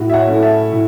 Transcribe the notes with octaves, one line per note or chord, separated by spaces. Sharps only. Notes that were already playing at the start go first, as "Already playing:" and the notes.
Already playing: A2 F#4
E5
C#5 F#5
A3 C#4 E4
E5 A5
A2